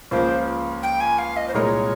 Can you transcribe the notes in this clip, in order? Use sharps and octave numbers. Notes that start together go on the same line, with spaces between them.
C#2 C#3 F3 A#3 C5
G5
G#5
F5
D#5
C5
C2 A#2 G#3 D#4 A#4 C#5